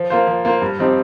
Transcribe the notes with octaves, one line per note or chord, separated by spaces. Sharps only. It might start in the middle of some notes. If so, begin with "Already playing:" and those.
Already playing: F3
A#3 F4 C5
F3
A#3 F4 C5
G2
F3 C4 D#4 G4